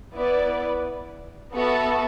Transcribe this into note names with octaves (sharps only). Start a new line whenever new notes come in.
B3 E4 B4 D5
B3 F#4 A4 E5 A5